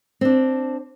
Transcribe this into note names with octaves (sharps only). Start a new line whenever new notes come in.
C4 D4